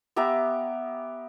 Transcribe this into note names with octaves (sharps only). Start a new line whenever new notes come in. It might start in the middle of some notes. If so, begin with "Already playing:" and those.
B3 G4 E5 A#5